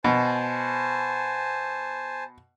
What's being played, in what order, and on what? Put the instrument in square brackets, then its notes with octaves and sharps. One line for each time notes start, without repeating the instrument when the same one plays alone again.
[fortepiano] B2 [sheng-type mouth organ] C5 G#5 A5